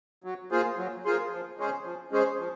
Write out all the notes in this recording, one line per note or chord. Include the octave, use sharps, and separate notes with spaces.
F#3
A#3 F4 G#4 C5
F#3
A#3 F4 G#4 C5
F3
G#3 C#4 G#4 C5
F3
G#3 C#4 G#4 C5
F3